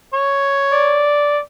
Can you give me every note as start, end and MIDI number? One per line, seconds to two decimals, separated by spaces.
0.14 1.09 73
0.73 1.41 74